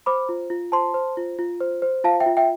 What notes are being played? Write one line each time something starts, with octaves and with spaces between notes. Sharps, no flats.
C5 B5 D6
F4
F4
C5 A5 C6
C5
F4
F4
C5
C5
F4 F5 A5
E5 G5
F4
E5 G5